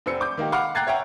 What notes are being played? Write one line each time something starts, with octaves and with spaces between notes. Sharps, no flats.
F1 C4 E6 C#7
D6 G6
D#3 A#3 D#4 G4
F5 F#5 B5 D6 F6
G5 A#5 F#6 G#6 A6 C7
C#5 E5 F#5 G5 A#5